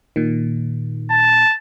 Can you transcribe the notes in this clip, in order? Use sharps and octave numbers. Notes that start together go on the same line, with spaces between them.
A#2 D#3
A5